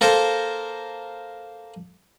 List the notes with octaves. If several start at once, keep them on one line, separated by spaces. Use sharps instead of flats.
A#3 A4 A#4 C5